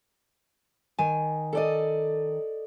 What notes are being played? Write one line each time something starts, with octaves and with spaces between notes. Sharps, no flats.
D#3 G#5
A4 D5 D#5